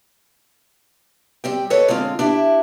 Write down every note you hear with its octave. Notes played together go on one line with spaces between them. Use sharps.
G3 C4 G5
A4 B4 C#5 D#5
D3 G#3 C4 F4
D4 E4 G4